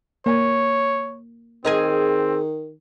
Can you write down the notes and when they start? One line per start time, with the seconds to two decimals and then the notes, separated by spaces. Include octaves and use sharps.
0.26 A#3 C#5 G#5
1.65 D#3 C4 G#4 A#4 D#5